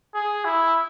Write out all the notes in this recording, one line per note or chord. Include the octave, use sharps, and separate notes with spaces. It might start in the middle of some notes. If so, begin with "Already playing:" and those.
G#4
E4